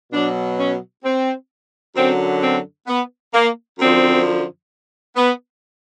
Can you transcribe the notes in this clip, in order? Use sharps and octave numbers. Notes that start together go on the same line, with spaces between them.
B2 F#3 D4
C#4
C4
F#2 D3 F#3 C4
C4
B3
A#3
F#2 D3 F3 C4
B3